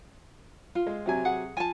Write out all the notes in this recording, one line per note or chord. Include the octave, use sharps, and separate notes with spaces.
F4
G#3
C3 F#3 G#5
G#4 F#5
F3 G#5 A5